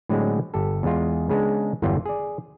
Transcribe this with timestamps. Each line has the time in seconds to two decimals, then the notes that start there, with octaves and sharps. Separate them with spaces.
0.09 A2 D3 F#3 G#3 B3 C4
0.54 G1 G4 A4
0.83 E2 G#3 F4
1.29 C#3 G#3 B3 D4
1.82 G1 E2 E3 F#3 F4 G5
2.06 G#4 D5